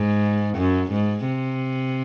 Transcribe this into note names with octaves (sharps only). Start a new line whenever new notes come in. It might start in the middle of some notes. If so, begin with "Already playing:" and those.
Already playing: G#2
F#2
G#2
C3